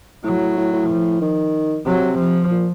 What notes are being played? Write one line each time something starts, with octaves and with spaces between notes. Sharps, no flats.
A2 F#3
A2
A2
F3
D#3
C3 F#3
F3
A#2